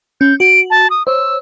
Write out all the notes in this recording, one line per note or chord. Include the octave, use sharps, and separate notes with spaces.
C#4 G6
F#4 D7
A5
D#6
C5 C#5 E6